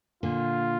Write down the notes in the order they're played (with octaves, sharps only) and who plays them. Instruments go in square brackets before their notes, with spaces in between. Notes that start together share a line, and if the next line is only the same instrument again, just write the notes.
[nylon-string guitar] A#2 D3 [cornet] F4